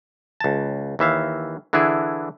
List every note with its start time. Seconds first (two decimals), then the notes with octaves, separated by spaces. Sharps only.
0.40 C#2 A5
0.99 D#2 E3 E5 F5
1.73 D3 E3 D4 E4 G#4